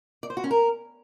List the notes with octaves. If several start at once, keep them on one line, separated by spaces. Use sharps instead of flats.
D5
C5
F#4
C#4
A#4